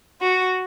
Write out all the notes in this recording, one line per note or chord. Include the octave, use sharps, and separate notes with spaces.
F#4